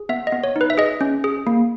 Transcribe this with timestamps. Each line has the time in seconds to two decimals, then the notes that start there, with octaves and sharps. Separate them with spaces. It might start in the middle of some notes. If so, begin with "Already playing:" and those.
Already playing: G#4
0.09 B3 E5
0.27 D#5
0.32 B3
0.44 C#5
0.56 D#4
0.61 B4
0.70 E5
0.78 G#4 D#5
1.01 C#4
1.24 G#4
1.47 A#3